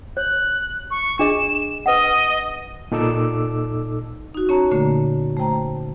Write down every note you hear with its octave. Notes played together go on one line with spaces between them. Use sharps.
C#5 F#6
C#6
D4 G#4 D#5 E7
B4 D#5 F#5
A#2 D#4 A4 D6 E6
D#4 F#4
C#4 F#4 C#5 A5 A#5
A#2 D3 A3 A#3
A3 C5 G5 A#5